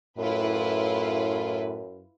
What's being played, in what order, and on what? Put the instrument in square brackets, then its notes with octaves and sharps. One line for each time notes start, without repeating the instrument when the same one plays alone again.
[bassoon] F#2 [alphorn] A2 [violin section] E4 F4 B4